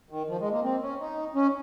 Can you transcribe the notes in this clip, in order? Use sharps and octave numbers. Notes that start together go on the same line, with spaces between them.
D#3
F3
G#3
A#3
C4
C#4
D#4
C#4